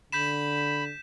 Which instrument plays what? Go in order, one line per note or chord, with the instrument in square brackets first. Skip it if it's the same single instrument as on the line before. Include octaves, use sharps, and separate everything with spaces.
[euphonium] D3 [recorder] B5 [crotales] G6 B6 E7